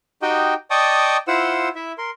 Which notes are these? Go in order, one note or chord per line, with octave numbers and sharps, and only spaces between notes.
D#4 F#4 G4 D#5 G5
D5 D#5 G5 A5 C#6 D#6
E4 F4 C5 F#5 E6
E4 E5
A#4 C6